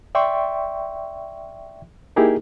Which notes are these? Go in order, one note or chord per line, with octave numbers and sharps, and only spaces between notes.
D5 E5 G5 C6 C#6
A#3 D#4 E4 G4 G#4 A#4